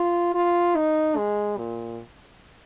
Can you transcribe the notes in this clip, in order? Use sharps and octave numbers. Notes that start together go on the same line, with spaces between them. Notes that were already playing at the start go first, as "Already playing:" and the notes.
Already playing: F4
F4
D#4
G#3
A#2